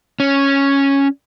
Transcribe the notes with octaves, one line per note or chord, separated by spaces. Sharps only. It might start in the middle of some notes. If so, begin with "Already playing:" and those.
C#4